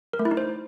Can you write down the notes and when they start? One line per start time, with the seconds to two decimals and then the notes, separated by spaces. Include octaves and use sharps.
0.13 A#4
0.19 A3
0.25 E4
0.31 D#4
0.37 C5